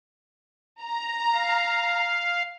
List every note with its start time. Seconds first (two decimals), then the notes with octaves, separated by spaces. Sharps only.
0.82 A#5
1.33 F5